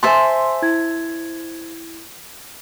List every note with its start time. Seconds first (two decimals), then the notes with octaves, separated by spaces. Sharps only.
0.03 C5 E5 G#5 A5 C6
0.62 E4 G#6